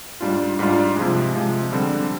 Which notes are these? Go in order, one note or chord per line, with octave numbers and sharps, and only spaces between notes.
G#2 G3 D4 F4
G#2 G3 D4 F4
C3 F3 G#3
C3 F3 G#3
D3 G3 C4